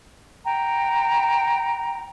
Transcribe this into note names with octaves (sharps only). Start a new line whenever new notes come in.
F#5 G5 A#5 B5